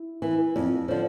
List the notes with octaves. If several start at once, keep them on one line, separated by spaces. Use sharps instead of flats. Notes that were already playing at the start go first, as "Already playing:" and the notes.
Already playing: E4
E3
F2
D3 F3